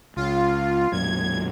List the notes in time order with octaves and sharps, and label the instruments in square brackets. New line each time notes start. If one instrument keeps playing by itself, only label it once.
[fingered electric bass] C#2 [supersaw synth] F4
[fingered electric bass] B1 F#2 A#2 [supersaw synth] G#6